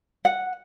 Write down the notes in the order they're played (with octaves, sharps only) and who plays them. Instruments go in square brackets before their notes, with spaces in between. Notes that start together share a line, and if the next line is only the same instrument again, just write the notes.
[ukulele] F#5